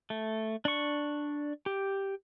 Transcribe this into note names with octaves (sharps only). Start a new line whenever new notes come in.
A3
D4 C#6
G4